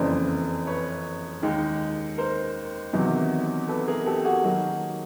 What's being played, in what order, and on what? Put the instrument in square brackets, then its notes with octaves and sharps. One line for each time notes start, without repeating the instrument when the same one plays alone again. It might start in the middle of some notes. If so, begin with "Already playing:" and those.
Already playing: [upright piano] F#1 F2 C#3 E3 C5 D5
B4 C#5
D#2 D#3 G#3
A#4 C5
E2 C3 D#3 F#3
A4 B4
G#4 A#4
G4 A4
G4
F#4 G#4
D#3 F#3 A#3